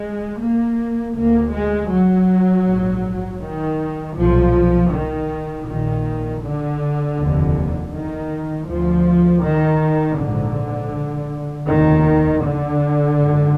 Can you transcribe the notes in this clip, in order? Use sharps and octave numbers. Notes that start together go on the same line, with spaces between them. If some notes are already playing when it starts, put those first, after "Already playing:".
Already playing: G#3
A#3
D2 A#3
G#3
F#3
A#1 G#2
D#3
B1 A#2 F3
D#3
A#1 A#2 D#3
D3
F1 D#2
D#3
D2 F3
D#3
A#1 G#2 D3
F1 D#2 D#3
D3
G#1 F#2